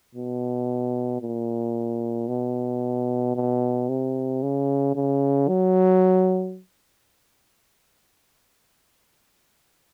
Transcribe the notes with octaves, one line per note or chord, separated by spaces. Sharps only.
B2
A#2
B2
B2
C3
C#3
C#3
F#3